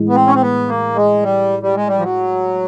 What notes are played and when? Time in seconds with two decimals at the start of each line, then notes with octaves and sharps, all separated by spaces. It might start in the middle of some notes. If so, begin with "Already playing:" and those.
Already playing: A2 E3 G#3
0.09 B3
0.15 C4
0.27 C#4
0.35 C4
0.42 B3
0.69 A#3
0.96 G#3
1.23 G3
1.63 G3
1.75 G#3
1.88 G3
1.99 F3
2.03 F#3